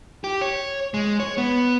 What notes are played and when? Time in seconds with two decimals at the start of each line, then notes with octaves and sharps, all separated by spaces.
0.24 G4
0.41 C#5
0.94 G#3
1.20 C#5
1.38 B3